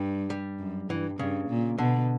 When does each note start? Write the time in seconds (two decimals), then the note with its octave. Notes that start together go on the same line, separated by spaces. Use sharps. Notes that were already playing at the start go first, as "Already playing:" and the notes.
Already playing: G2 G3
0.30 G3
0.59 F#2
0.89 G2 E3
1.19 G2 C#3
1.49 A#2
1.78 B2 D3